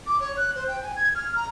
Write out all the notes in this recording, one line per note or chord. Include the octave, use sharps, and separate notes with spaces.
D6
C#5
F#6
C5
G5
G#5
G#6
F6
A#5